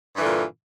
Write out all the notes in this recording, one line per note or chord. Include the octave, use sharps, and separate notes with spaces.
G2 A#2 D3 E3